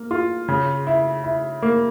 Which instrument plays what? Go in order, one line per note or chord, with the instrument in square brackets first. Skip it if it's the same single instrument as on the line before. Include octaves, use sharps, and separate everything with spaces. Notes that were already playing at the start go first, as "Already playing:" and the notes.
Already playing: [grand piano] A#3
F4
C#3
E4
E4
A#3